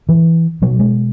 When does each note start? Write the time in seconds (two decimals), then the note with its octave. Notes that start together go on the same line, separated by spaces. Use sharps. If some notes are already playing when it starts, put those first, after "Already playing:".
0.09 E3
0.62 B2 F#3
0.79 G#3